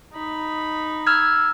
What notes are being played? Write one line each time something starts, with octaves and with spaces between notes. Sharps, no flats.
D#4 B5
E6 F6 G#6